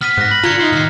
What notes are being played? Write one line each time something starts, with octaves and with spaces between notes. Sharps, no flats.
B3 F6 B6 D#7
G#2 F#6 A#6
B5
D3 F4 A#5 G#6 C#7
D#4 E4 C5
A2 D#3 F6 C7